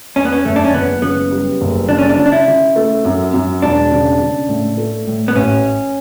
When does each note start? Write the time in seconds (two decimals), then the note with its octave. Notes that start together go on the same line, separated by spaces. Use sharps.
0.16 E2 C#4
0.25 B3
0.32 C#4
0.45 F#1 A3
0.56 D4
0.64 C#4
0.73 F#1 B3
1.02 C#3 B3
1.31 G3
1.61 F#1
1.89 C#3 D4
1.98 C#4
2.09 D4
2.18 C#3
2.26 D4
2.32 E4
2.48 C#3
2.76 A3
3.05 F#2
3.34 F#2
3.62 E1 D4
3.92 C#3
4.20 C#3
4.49 A2
4.77 A3
5.07 A2
5.28 B3
5.36 A1 C#4